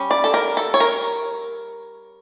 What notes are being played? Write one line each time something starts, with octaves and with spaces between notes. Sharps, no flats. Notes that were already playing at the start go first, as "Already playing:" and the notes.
Already playing: G3 C#4
D5
A4
A#4
A4
C#5
A#4